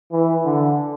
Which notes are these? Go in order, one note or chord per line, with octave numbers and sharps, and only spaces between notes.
E3
D3